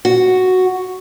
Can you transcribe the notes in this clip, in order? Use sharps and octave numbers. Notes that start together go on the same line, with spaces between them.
F#4